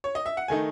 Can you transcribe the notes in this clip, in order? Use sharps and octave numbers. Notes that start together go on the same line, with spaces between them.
C#5
D#5
E5
F#5
D#3 A3 D#4 G#5